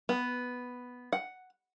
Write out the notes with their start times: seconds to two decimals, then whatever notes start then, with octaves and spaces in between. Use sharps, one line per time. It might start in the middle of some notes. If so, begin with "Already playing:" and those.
0.09 B3
1.13 F#5